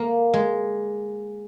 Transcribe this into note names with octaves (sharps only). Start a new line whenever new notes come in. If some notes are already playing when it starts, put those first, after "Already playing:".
Already playing: A#3
G#3